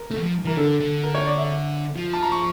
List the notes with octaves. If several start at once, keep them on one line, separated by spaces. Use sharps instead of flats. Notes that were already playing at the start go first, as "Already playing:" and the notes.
Already playing: A#4
A3
E3
F3
E3 A#4
D3 A4
D3
A#4
C#5
D5
E5
F3
A5
A#5
C#6